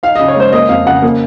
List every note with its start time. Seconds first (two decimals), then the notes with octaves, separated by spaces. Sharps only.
0.03 D#4 F5
0.16 C#3 D#5
0.28 C#5
0.36 G#3 C5
0.52 A#3 D#5
0.69 F2 F5
0.86 C#3 F#5
1.02 A#3